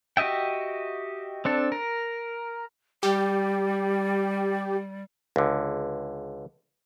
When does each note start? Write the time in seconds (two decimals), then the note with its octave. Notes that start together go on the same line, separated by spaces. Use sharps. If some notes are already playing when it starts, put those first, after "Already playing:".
0.17 F#4 G4 D#5 E5 G5
1.45 C4 D4 A4
1.72 A#4
3.03 G3 G4
5.36 C#2 D3